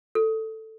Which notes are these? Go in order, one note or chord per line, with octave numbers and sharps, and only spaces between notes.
A4